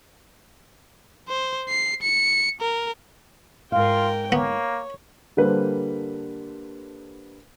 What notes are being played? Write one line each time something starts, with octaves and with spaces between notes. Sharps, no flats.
C5
C7
C#7
A#4
G#2 F4 A#4 F5 G5
A#3 B3 C#5
D3 G3 A#3 A4 B4 C5